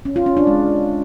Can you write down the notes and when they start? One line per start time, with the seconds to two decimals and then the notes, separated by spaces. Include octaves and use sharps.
0.05 C#4
0.16 F4
0.26 C#4
0.37 D4
0.47 G#3